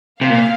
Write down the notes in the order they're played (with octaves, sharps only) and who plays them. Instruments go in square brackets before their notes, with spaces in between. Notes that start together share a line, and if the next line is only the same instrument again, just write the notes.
[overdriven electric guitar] C3 [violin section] F5
[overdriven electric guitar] A#2